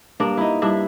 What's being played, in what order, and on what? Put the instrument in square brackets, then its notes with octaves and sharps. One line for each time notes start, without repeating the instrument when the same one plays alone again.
[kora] G2 A#3 D4
D#4 E4
G2 D4 E4 E5